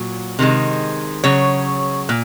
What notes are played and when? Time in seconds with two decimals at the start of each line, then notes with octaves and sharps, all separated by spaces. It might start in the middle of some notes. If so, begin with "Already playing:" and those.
Already playing: A#2 F#3
0.39 C3 D#3 G#3
1.24 C#3 F#3 C#5
2.09 A#2